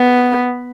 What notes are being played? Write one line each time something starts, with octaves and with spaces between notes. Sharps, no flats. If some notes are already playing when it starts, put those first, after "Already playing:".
Already playing: B3